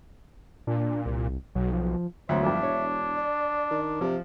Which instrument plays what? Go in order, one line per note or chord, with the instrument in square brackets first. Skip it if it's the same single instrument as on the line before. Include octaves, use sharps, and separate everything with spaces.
[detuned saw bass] A#2 [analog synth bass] D4
[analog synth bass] C2
[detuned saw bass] B1 [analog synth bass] F#3
[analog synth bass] F3
[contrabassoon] E1 [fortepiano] D2 F#3 [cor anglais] C5 [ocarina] E5
[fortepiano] G2 F3 [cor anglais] D4
[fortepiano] C#5
[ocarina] D5
[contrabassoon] D#3
[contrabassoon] C3 [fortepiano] F3